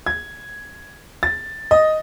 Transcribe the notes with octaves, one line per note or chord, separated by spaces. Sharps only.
G#6
A6
D#5